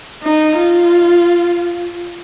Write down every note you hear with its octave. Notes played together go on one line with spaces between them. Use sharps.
D#4
F4